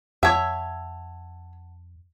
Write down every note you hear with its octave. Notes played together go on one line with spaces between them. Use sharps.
F2 C#5 E5 F#5 A5 G#6